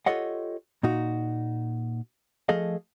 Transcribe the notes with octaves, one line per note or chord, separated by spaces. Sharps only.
F4 G4 A4 C#5 D#5 F#5
A#2 D#4 F#4
F3 A3 G#4 A4 D#5 F5